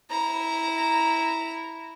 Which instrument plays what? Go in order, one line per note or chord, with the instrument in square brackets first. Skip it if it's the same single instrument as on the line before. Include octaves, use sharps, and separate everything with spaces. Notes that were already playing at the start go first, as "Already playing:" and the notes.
[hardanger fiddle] E4 [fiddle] A#5